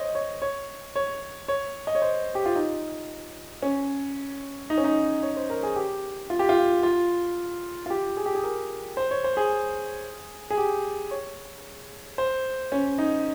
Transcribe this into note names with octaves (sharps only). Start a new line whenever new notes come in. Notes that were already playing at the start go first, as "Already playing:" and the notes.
Already playing: C5 C#5 D#5
C#5
C#5
C#5
C#5
D#5
C#5
C5
G4
F4
D#4
C#4
D#4
C#4
D#4
C#5
C5
A#4
G#4
G4
F4
G4
F4
F4
F4
G4
G#4
G4
G#4
A#4
C5
C#5
C5
G#4
G#4
G4
C#5
C5
C#4
D#4